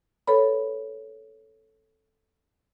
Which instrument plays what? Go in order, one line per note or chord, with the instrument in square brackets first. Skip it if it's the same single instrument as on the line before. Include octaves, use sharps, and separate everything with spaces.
[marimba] A4 B4 C#5 B5